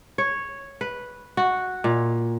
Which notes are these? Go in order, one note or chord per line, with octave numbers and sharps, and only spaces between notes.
C#5
B4
F#4
A#2